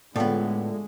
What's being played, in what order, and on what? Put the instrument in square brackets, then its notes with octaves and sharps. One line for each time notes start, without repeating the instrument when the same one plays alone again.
[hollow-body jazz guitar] A2 B3 [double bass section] D3 G#3 A3 [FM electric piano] F4 A4 D5